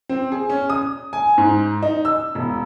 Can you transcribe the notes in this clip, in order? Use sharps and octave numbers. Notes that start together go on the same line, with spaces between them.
C4
G#4
C#4
D#6
G#5
G#2
D#4
E6
E1